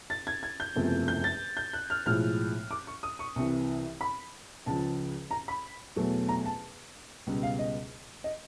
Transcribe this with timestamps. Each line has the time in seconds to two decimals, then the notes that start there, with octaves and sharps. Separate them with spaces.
0.10 A6
0.27 G#6
0.43 G#6
0.60 G6
0.75 F#1 E2 C3 F3 A3
1.08 G6
1.24 A6
1.57 G6
1.73 F#6
1.90 F6
2.06 B1 A2 F3 G#3 F6
2.71 D6
2.87 C#6
3.03 D#6
3.19 C#6
3.36 C2 C3 E3
4.01 B5
4.66 C#2 C#3 F3 A5
5.31 A#5
5.48 B5
5.96 E2 B2 F#3 A3
6.29 A#5
6.45 A5
7.27 C#2 B2 G3
7.43 F5
7.59 D#5
8.24 D#5